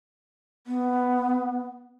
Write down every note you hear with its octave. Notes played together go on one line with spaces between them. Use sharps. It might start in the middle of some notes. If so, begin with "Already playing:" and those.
B3